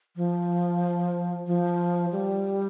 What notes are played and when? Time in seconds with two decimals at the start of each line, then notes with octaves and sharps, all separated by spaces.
0.16 F3
1.47 F3
2.12 G3